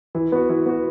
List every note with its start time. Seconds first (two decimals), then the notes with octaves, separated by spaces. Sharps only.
0.15 E3
0.32 B3 F#4
0.49 E3
0.66 B3 F#4